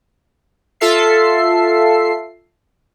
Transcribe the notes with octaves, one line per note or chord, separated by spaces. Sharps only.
F4 A4 E5 C7